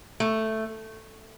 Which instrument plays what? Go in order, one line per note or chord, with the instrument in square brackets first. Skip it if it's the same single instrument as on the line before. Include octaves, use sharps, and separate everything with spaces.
[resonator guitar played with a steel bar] A3